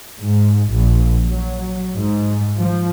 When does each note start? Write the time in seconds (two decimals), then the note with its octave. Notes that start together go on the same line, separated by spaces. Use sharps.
0.21 G#2
0.73 A#1
1.23 F#3
1.95 G#2
2.60 F3